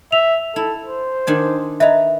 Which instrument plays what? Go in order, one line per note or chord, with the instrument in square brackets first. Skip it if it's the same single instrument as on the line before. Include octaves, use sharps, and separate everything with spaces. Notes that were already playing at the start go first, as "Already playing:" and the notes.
[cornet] E5 [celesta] F7
[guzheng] E4 [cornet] A4
[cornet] C5
[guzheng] D#3 D4 G#5
[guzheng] B4 A#5 [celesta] D#5 E5